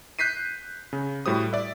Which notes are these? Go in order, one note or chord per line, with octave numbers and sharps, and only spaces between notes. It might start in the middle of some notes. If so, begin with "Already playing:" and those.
F#6 G6 B6 C7 D#7
C#3
A2 G3 F#4 G4 C5 D#6
D5 E5